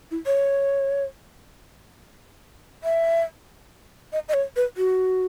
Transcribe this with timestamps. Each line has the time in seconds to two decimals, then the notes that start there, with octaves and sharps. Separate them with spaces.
0.11 E4
0.26 C#5
2.84 E5
4.13 D#5
4.29 D#5
4.34 C#5
4.56 B4
4.77 F#4